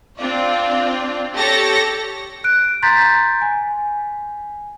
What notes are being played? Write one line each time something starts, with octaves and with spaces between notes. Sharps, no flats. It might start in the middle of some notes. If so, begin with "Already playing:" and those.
C4 D4 F4 D5
G4 A4 C#5 A6 A#6 C#7
F#6 D7
A#5 C6 G6 A6 B6
G#5